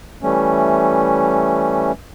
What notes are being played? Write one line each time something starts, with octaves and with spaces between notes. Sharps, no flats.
E3 G3 A3 C#4